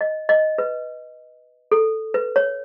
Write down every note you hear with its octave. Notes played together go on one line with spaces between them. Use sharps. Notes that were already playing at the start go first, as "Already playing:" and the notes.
D#5
D#5
B4
A4
B4
C#5